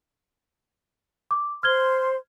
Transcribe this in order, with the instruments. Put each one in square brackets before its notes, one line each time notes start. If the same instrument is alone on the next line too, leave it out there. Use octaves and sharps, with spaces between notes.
[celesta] D6
[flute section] C5 C6 [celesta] F6 G#6 G7